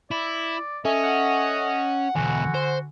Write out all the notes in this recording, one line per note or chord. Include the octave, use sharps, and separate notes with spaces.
E4 D5
C#4 A4 D#5 E5 G#5
F#5
E2 B2 D3 F#4 G#5
C5